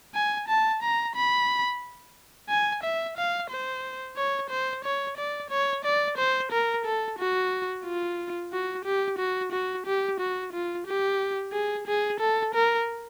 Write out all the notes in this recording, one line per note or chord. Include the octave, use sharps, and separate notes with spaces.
G#5
A5
A#5
B5
G#5
E5
F5
C5
C#5
C5
C#5
D5
C#5
D5
C5
A#4
A4
F#4
F4
F#4
G4
F#4
F#4
G4
F#4
F4
G4
G#4
G#4
A4
A#4